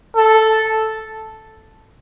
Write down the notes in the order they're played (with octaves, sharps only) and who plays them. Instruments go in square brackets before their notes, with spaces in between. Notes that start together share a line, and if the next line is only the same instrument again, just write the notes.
[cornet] A4